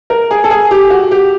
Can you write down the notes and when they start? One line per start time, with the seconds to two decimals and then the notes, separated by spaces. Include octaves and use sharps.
0.10 A#4
0.31 G#4
0.44 A4
0.51 G#4
0.71 G4
0.90 F#4
1.11 G4